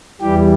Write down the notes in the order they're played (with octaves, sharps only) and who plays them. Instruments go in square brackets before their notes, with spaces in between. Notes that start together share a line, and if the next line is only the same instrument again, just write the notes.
[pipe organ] E2 E3 G3 G4